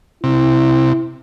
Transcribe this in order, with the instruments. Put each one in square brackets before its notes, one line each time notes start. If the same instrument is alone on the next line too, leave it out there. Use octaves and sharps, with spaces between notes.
[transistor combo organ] C3 [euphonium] E4